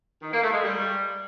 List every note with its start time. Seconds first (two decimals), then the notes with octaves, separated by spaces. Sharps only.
0.22 D#3
0.32 A#3
0.43 A3
0.53 G#3
0.63 G3